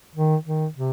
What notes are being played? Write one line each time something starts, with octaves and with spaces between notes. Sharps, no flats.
D#3
D#3
C3